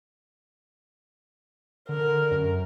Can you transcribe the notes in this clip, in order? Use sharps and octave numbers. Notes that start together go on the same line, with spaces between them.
D3 A#4
F#2